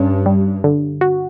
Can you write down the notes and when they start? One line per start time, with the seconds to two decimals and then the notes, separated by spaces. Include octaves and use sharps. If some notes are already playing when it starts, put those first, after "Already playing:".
Already playing: G2 C#4
0.26 G3
0.64 D3
1.01 F#4